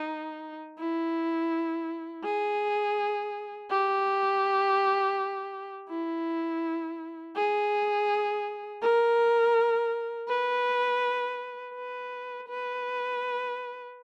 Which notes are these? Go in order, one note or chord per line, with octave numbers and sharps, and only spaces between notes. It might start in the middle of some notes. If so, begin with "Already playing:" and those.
Already playing: D#4
E4
G#4
G4
E4
G#4
A#4
B4
B4
B4